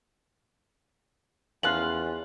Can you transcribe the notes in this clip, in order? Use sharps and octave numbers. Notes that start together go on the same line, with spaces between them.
E2 F3 C#4 F4 F6 F#6 F#7